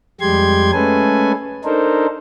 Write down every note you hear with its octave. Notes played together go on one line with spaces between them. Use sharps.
F2 G3 G#3 G4 C6 G#6
G#3 A3 C#4 A4 B4 G#5
D4 D#4 A4 A#4 C5